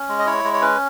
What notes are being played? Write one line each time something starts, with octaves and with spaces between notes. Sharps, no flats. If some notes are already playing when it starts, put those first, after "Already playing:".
Already playing: C#4
G#3
D#5
E4 C#5
G#3
C#5
C#4 B4